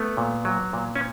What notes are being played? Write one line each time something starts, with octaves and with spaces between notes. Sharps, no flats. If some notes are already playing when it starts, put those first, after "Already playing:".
Already playing: A3 B3
A#2
F#3
A#2
C#4